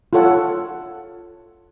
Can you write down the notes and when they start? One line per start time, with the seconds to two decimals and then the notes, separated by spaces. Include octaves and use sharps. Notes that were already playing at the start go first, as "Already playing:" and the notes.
0.13 F4 A4 C#5 F#5